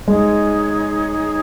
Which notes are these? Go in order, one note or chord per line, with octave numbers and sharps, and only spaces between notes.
G#3 D#4 G#4 C#5